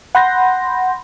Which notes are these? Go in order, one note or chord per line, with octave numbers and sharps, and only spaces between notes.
F#5 B5 C6 G6 A#6